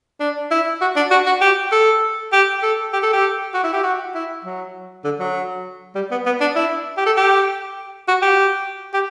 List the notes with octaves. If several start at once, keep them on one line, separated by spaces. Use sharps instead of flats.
D4
E4
F#4
D4
F#4
F#4
G4
A4
G4
A4
G4
A4
G4
F#4
E4
G4
F#4
E4
F#3
D3
F#3
G3
B3
B3
D4
E4
G4
A4
G4
F#4
G4
G4